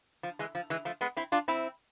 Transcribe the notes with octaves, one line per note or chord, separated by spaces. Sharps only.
F3
E3 G#3
F3
E3 G#3
F3 A3
G#3 B3
C4 E4
D4 F4
C4 E4